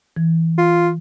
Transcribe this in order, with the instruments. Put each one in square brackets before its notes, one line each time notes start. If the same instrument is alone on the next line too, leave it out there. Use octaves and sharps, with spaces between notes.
[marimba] E3
[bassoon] F4